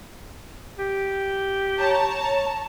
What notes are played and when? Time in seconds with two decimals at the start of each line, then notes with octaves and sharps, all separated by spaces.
0.78 G4
1.78 C#5 A5 A#5